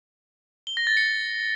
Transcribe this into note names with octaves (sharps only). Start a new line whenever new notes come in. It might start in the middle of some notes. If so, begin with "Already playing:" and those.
G7
A#6
A6
C#7